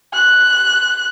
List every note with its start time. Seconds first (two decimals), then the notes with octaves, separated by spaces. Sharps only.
0.14 F#6